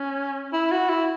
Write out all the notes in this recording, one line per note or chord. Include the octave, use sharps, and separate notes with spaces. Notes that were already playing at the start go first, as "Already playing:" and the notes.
Already playing: C#4
E4
F#4
E4